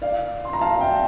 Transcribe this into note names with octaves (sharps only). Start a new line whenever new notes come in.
D5 F5
C6
A#5
F5 A5
E5 G5